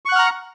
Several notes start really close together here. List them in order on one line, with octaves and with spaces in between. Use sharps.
C#6 F#6 F#5 F6 A#5